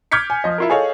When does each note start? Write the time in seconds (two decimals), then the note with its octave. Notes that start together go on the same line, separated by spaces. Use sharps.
0.12 D6 F6 G6 G#6 B6 C#7
0.30 G#5
0.44 F3 D#5
0.58 E4 F4 A#4
0.70 G#4 A4 C#5 D#5 F5